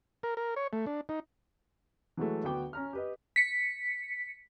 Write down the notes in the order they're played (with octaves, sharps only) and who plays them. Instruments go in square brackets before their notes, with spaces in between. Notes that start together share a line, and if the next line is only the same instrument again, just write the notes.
[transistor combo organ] A#4
A#4
C#5
A3
D4
D#4
[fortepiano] E3 F#3 G#3 A3
D2 B3 F#4 G5 D6
C#4 A#5 F6
G4 B4 D#5
[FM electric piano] B6 C#7